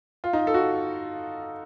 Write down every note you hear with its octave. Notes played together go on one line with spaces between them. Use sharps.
F4
D#4
A4
F#4